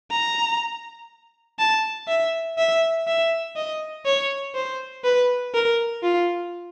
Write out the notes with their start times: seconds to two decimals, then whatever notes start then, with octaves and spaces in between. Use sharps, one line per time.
0.11 A#5
1.59 A5
2.08 E5
2.58 E5
3.08 E5
3.57 D#5
4.06 C#5
4.55 C5
5.04 B4
5.54 A#4
6.03 F4